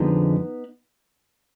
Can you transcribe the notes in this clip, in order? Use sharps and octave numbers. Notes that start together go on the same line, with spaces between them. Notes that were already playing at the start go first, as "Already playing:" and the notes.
Already playing: F2 D3 F3 G#3 B3 D#4